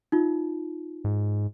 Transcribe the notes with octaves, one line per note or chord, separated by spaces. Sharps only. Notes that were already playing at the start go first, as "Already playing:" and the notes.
D#4 F4
G#2